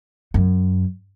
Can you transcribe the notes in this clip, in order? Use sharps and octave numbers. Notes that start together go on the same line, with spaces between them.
F#2